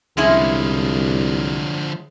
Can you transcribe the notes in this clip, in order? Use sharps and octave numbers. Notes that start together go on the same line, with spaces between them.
C2 D3 F3 G#3 C#4 E4